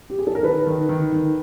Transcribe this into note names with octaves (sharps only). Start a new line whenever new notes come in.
G4
G#4
A4
A#4
D#3 A4 B4
D#3
D#3
D#3